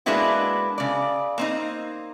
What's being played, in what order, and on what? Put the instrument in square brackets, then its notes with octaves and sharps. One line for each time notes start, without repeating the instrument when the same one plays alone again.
[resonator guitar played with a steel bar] G#3 A#3 B3 D4 E4 F#4
C#3 D5
A#3 C4 D#4